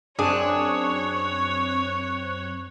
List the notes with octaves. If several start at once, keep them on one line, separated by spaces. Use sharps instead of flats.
F#2 C4 D4 G#4 C#5 F#6